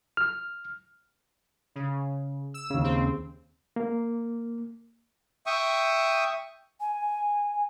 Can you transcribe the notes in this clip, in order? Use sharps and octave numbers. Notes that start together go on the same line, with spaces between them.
F6
C#3
E6
D#2 C#3
C4
A#3
E5 G5 C#6 D#6
G#5